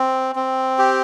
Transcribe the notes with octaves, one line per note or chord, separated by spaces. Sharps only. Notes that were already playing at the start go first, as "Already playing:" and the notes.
Already playing: C4
C4
G4